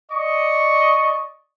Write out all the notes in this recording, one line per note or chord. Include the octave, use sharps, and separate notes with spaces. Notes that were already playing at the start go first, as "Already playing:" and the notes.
D5 D#5 C#6